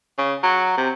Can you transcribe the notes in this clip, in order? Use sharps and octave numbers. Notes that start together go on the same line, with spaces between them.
C#3
F#3
C3